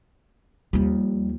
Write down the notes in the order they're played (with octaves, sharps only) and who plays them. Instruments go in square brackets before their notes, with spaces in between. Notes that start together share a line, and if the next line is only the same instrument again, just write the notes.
[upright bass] D#2 F3 [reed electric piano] G3